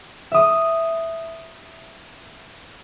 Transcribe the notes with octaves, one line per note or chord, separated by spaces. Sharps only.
E5 D#6